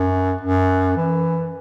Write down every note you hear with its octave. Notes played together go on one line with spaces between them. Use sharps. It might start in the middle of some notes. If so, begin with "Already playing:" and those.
Already playing: F#2
F#2
E3